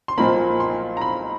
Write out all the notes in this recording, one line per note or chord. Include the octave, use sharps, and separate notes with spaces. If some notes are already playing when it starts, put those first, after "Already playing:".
C6
B1 A#2 F3 A#3 B5
C6
A#5
B5